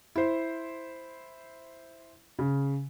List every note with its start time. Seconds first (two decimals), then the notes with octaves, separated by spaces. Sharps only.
0.16 E4 C5
2.39 C#3